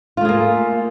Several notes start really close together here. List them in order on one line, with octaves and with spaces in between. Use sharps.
F4 A3 G#4 A#3